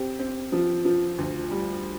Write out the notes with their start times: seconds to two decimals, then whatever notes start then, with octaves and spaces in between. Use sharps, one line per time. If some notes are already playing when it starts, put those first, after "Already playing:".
Already playing: C4 G4
0.19 C4
0.52 F3
0.85 F3
1.18 D2
1.51 G3